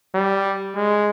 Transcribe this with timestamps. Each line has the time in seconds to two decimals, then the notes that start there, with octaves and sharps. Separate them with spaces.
0.14 G3
0.75 G#3